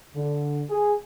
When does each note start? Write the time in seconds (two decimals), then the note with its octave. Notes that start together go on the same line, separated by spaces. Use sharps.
0.14 D3
0.69 G#4